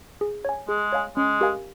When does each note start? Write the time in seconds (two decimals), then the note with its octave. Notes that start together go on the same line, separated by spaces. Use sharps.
0.21 G#4
0.45 C#5 G#5
0.69 G#3 G#4
0.92 C#5 F5 G#5
1.17 G#3 C#4
1.41 G4 A#4 F5 G#5